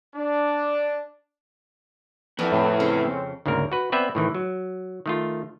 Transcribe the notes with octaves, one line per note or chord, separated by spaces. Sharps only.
D4
F2 B3 E4 D5 G#5
A2 C4
C#3 C4 C#4
D2 G#2 C#3 A#3 A#4
F#4 B4
B3 C4 B4 D5 E5
A2 D#3 E3
F#3
D#3 A3 F4